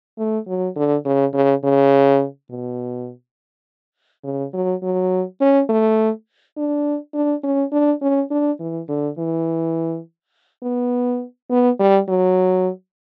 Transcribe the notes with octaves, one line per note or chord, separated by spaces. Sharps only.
A3
F#3
D3
C#3
C#3
C#3
B2
C#3
F#3
F#3
C#4
A3
D4
D4
C#4
D4
C#4
D4
E3
D3
E3
B3
B3
G3
F#3